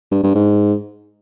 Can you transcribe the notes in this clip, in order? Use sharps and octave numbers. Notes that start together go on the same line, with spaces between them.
G2
G2
G#2